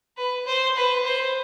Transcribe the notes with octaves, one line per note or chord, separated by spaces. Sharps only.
B4
C5
B4
C5